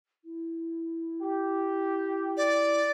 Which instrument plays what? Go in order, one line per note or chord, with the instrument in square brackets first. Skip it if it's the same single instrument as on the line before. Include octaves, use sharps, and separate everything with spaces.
[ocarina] E4
[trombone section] G4
[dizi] D5